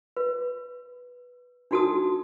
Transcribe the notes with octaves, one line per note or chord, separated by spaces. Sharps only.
B4
D4 D#4 F#4 A4 A5 D#6